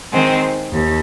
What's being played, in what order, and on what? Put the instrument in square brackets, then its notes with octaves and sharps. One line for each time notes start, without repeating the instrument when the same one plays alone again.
[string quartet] D#3 G#3 C4
D#2